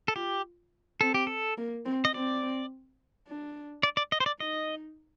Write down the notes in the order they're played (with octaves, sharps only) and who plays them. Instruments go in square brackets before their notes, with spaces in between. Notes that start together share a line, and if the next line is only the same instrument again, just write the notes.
[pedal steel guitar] A4
[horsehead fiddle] F4 [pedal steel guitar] G4
[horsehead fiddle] C4 [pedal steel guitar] A4
[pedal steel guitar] G4
A4
[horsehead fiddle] A#3
C4
[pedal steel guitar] D#5
[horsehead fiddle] C4 [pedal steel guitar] D5
[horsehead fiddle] D4
[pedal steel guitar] D5
D5
D#5
C5
D5
[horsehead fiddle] D#4 [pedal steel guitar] D#5